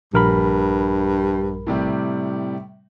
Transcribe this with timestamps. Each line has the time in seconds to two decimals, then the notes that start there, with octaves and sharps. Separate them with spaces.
0.14 A#1 G2 A#4 B5
1.67 A2 C3 G3